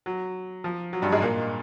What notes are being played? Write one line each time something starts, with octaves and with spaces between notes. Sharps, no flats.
F#3
F3
F#3
G2 G3
G#2 G#3
A#2 A#3